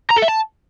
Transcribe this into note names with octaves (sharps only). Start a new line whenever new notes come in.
A#5
A4
E5
A5